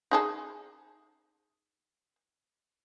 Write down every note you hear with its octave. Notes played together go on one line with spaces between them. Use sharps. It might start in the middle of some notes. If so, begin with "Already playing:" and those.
D#4 G#4 A4